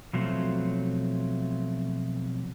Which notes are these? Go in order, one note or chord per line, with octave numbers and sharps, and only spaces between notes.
B2 F3 F#3 A3 C4